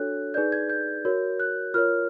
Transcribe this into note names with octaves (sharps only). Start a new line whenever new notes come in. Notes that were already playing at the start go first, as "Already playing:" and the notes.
Already playing: D4 F#4 A4 C#5 F#6
D#4 G#4 B4 D5 G6
G#6
G6
F#4 A#4 C#5
F#6
F4 A#4 C#5 F6